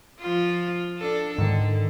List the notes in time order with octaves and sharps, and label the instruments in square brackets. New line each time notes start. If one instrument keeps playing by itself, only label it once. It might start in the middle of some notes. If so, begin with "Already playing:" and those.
[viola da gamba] F3 F4
D4 A4
[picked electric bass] G#2 D#3 [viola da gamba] D3